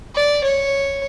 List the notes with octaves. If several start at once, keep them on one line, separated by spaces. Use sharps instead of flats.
D5
C#5